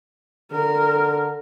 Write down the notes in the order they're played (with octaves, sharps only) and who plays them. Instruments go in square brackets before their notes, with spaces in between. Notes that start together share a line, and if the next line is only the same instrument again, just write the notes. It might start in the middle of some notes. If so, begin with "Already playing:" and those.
[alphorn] D3 [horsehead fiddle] A#4